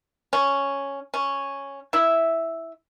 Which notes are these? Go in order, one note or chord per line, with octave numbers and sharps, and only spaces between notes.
C#4
C#4
E4 E5